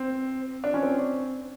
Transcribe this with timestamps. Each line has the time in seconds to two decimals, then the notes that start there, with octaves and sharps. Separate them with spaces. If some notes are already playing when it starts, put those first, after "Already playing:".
Already playing: C4
0.64 D4
0.74 C#4
0.83 C4